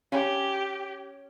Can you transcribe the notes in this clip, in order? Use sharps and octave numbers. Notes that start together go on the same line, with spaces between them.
C#4 G4